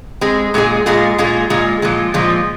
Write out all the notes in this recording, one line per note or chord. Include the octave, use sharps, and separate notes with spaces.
G#3 C4 G#4
A#2 G#3 F4 G#4
A#2 G#3 F4 G#4
A#2 G#3 F4 G#4
A#2 G#3 F4 G#4
A#2 F3 G#3 F4
A#2 F3 G#3 F4